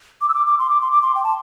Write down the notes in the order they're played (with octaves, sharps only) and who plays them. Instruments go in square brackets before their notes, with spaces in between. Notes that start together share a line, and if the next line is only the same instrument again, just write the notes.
[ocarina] D6
E6
D6
D6
C6
D6
C6
D6
C6
G5
A5